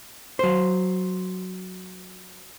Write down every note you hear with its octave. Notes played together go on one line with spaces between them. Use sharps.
F#3 C5